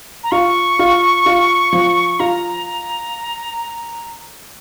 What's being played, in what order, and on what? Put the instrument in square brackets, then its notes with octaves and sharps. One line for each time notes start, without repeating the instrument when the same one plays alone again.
[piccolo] A#5
[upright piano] F4 [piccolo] C#6
[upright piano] F4
F4
F3
[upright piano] F4 [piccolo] A#5